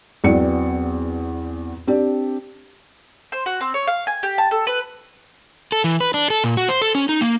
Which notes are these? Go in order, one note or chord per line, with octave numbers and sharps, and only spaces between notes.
E2 F#3 B3 C4 D5 C#7
C4 D4 G4 D5
C5
F#4
C4
C#5
F5
G#5
G4
A5
A4
B4
A4
E3
B4
D4
A4
A#2
F#4
C5
A4
C#4
D#4
A#3